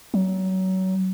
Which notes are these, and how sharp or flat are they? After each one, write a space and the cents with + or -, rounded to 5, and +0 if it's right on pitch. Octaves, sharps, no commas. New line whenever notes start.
F#3 +25